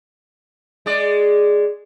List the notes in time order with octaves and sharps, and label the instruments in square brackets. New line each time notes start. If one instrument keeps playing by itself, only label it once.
[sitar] G#3 D5